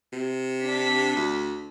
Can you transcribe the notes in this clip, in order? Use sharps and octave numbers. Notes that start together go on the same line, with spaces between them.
C3
D4 B6
D2